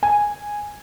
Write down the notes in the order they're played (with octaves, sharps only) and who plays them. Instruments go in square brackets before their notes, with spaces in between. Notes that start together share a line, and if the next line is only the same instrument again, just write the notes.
[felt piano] G#5